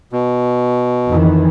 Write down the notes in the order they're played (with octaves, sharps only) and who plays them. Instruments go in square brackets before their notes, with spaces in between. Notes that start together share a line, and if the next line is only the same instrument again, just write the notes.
[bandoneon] B2
[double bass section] F2 D#3 E3